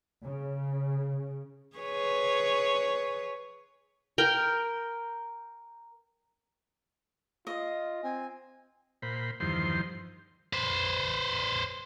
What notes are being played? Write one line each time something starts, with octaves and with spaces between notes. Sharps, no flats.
C#3
G#4 B4 C#5
A#4 G5
F4 D#5
C4 G#5
A#2 C5 B5
E2 G2 D#3 F3 C5 C6
B4 C5